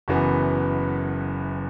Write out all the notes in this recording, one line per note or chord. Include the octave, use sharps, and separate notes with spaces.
F#1 F#2 E3 B3